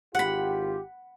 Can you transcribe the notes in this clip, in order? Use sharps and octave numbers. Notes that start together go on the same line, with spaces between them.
G#1 F4 G4 F#5 B5